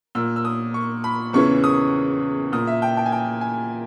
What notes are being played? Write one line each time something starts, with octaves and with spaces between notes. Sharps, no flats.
A#2 E6
E6
D#6
C#6
B5
E2 C#3 E3 C#6
D#6
A#2 D#6
E5
G5
G5
G#5
G5
G#5